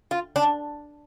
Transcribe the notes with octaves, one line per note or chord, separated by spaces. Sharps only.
F4
D4